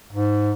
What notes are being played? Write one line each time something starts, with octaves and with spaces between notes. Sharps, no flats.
G#2